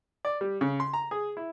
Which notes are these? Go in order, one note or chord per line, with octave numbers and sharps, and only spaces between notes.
D5
G3
C#3
C6
A#5
G#4
E4